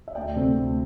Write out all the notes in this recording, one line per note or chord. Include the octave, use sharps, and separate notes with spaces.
E5
D2 D5 G5
C3 A3 C4
D2